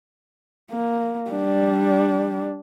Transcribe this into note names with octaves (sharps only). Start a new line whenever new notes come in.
A#3
G3 D4